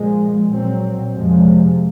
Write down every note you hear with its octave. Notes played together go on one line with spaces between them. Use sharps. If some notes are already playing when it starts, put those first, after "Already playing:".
Already playing: A#2 F3 G#3
A#2 F#3 C4
F2 C3 F3 G#3